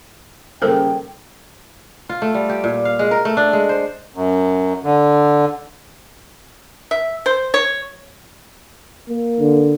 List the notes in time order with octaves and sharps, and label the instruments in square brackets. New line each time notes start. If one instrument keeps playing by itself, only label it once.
[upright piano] D#1 C#3 A#3 [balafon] A4 A#4 C5 [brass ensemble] G5
[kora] F4
A3
G3
G4
A#2
F5
G#3
A#4
A3
D4
G#3
C5
[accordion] F#2
D3
[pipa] E5
C5
C#5
[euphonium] A#3
[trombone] D3